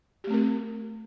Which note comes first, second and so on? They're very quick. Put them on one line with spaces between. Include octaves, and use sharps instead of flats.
G4 A3 C4 A#4